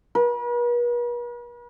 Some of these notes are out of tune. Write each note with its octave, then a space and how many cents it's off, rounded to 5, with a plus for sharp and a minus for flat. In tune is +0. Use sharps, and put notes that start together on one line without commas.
B4 -45